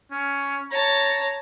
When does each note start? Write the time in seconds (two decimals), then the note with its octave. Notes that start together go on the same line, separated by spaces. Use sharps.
0.11 C#4
0.71 C#5 A5 A#5